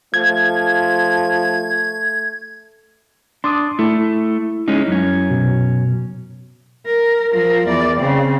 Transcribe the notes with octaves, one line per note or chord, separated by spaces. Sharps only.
F3 A3 G#6
D4 C6 D6 D#6
A3 E4
G#3 C#4 D#4
F#2 C#4
B2
A#4
F3 A#4
E2 D5
C#3 C4